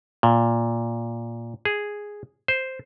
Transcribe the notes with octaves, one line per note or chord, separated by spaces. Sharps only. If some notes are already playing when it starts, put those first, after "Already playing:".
A#2
G#4
C5